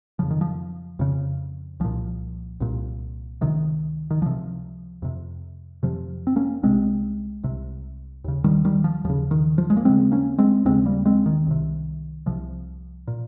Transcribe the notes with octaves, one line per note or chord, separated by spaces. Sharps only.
F2 C#3 F3
D#3
F3
F2 C#3
C2 A#2 F3
C2 A#2
C#2 C3 D#3
D#3
C#2 C3 F3
F2 C3
F2 C3 F3
C4
A#3 C#4
C2 C3 G#3 C4
C2 C3
D#2 C#3
D#3 G3
D#3 G3
F3
D#2 C#3 F3
D#3
F3
G#3
A#3
D#2 C#3 G#3 C4
A#3 C#4
G#3 C4
D#2 C#3 G#3 C4
G3 A#3
G#3 C4
D#3
C2 C3
C2 C3 F3
A#2